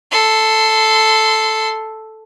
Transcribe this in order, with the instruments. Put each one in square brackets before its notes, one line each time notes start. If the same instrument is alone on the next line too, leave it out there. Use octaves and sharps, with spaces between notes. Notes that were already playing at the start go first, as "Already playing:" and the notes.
[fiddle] A4 C6